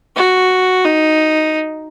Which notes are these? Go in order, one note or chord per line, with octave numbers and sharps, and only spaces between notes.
F#4
D#4